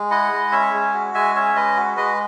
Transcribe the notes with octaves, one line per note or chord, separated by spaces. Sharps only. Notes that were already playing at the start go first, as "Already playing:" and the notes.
Already playing: G#3
E4 D#5 F#5
G#3
C#4 C#5 E5
G#3
F#4
G#3 E5 G#5
C#4 C#5 E5
G#3 B4 D#5
F#4
G#3 B4 D#5